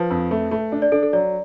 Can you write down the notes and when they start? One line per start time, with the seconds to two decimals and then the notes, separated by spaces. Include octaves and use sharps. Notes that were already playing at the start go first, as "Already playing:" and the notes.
Already playing: F3 B4 A5
0.11 F2
0.31 A3
0.51 A3
0.72 D4
0.82 D5
0.92 D4 A4
1.03 A4
1.13 F#3 D5